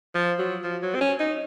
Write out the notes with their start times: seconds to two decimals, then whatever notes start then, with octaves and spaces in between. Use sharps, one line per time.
0.15 F3
0.39 F#3
0.63 F3
0.82 F#3
0.95 C4
1.01 C#4
1.20 D#4